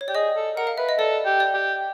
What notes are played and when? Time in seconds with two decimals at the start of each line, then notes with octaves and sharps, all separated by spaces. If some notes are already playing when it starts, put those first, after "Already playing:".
0.01 C#5
0.08 G4 D5
0.15 G#4 D#5
0.36 A4
0.56 A#4 F#5
0.67 F5
0.78 B4 E5
0.89 D#5
0.98 A4 D5
1.25 G4
1.40 D5
1.54 G4